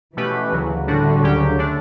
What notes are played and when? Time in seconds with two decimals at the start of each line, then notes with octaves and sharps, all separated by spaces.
0.16 B2 E3 A3 C#4 G4 B4
0.52 D2 C#3 F#3
0.88 A2 D3 G3 D4 F#4
1.23 D2 C#3 F#3 C#4 G4
1.58 D3 A3 D4